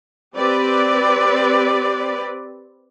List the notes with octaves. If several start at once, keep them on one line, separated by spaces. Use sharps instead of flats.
C4 G4 B4 D5